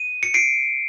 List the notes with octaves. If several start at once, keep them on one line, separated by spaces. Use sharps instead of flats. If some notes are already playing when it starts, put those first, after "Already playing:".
Already playing: D#7
C#7
C7 D7